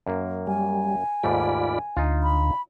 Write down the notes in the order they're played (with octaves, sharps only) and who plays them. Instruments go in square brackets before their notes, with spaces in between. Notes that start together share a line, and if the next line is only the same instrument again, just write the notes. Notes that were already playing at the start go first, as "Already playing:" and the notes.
[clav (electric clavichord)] F#2 A#3
[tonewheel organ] G3 [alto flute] G#5
[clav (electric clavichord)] D#2 G#2 A3 [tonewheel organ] F4 D5 B5
[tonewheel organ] D2 [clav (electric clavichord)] D#4 F4
[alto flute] B5